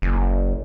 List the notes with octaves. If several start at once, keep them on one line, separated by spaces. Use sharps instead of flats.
F#1